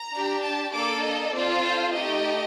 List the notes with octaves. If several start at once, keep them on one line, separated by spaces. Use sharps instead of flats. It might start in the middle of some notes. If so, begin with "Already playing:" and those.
Already playing: A#5
D4 G4
A5
A#3 D4 A4 D6
D#5
C4 F4 A4 D5
C5
A3 D#4 G4 D#5